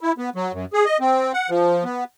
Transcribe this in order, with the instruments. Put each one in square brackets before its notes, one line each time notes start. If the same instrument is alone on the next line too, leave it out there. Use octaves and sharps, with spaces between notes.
[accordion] E4
B3
F#3
F#2
G#4
D#5
C4
F#5
F3
B3